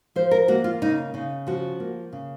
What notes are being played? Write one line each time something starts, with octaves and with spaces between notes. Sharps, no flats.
F3 C5
A#4
A#3 F#4
F4
C#3 D#4
C#3 D#4
F3 F#4
A#3
C#3